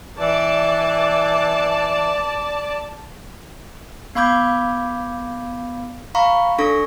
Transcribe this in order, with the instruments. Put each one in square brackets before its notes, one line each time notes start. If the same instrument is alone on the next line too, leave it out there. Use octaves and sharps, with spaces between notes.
[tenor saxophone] E3 [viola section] D5 A5
[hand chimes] B3 F5 B5 D6 G6 G#6
F5 A#5 B5 C#6
D4 A4 C#6 A#6